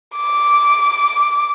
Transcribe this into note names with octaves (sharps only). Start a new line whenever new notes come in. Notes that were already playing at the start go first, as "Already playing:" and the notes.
D6